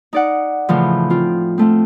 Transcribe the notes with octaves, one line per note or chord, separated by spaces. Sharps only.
D#4 D5 F#5
A2 C#3 E3 F3
C4 F4
F3 A3 C4